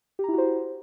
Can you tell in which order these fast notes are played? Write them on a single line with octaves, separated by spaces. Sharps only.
G4 A#5 E4 F#4 C5